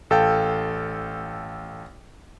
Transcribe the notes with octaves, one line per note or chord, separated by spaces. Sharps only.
A1 A4 F5 G5